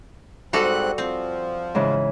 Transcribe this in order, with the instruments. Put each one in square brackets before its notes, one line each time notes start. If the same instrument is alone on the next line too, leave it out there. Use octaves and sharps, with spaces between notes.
[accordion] G#2 C4 F#6 [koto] G3 F#4 A4
[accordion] F3 [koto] C4
[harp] G#2 C#3 E3